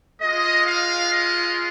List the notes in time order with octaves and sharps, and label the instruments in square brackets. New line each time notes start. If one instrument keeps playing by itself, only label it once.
[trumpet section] G#3 F4 D#5
F5
D#5